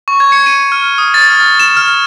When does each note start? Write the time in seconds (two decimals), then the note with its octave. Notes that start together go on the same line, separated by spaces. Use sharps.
0.08 C#6
0.20 G#6
0.32 C#7
0.46 D#7
0.72 F6
0.98 D#6
1.14 A6
1.30 F6
1.60 E7
1.77 F6